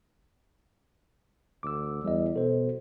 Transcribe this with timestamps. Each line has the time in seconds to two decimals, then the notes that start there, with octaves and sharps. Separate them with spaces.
1.63 D2 D6 E6
2.04 E2 G3 D#5
2.36 B2 A4 C5